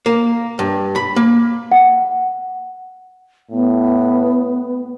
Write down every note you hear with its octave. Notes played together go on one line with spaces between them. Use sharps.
A#3
G2
B5
A#3
F#5
A2 B3